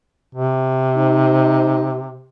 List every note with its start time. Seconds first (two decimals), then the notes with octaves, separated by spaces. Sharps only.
0.35 C3
0.96 D#4 C5